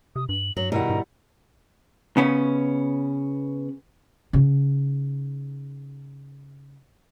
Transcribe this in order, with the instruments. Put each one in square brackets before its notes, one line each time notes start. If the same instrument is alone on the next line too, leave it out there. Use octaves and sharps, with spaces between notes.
[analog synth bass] C3 [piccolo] D#6
[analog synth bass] G2 [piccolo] F#7
[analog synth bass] G2 [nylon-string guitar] F#3 [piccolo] F#7
[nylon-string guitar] B2 D#3 [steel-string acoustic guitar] G3 E4 F#5 [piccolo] A#5
[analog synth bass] G#2
[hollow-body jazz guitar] C#3 B3 C#4
[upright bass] C#3 D#4